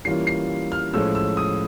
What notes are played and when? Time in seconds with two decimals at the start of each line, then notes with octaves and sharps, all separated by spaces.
0.05 E3 G3 A#3 C#4 F4 C7
0.27 C7
0.72 F6
0.94 A2 F3 G#3 C#4 E6
1.15 E6
1.37 D#6